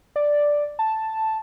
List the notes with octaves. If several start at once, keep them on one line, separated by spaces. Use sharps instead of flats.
D5
A5